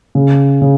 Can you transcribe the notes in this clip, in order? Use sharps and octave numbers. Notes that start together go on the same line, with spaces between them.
C#3
C#3